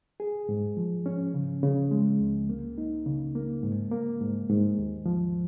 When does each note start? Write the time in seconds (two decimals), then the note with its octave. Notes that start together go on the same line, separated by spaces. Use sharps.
0.20 G#4
0.49 G#2
0.77 F3
1.06 C#4
1.34 C#3
1.63 C#3
1.91 G#3
2.20 C#2
2.49 A#3
2.78 D#4
3.06 C#3
3.35 A#3
3.63 G#2
3.91 A#3
4.20 G#2
4.50 G#2
4.78 D#2
5.06 F3